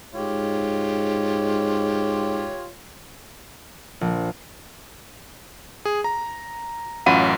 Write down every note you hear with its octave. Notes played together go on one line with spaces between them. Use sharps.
G#2 F4 G4 C#5
A#1
G#4
A#5
A1 F#2 F4 F5 F#5 D#7